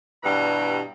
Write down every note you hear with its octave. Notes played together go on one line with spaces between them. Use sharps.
G2 B2 E3 G3 A#5